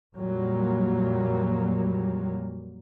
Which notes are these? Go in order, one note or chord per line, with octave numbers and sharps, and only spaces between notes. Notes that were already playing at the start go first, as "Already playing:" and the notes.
F2 A#2 F#3 G3 A#3